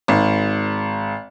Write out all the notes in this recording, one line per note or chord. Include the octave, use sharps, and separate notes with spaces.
G#1